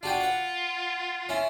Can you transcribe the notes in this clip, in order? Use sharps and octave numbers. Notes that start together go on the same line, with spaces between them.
D4 F4 F#4 G5
B4 F#5
C#4 E4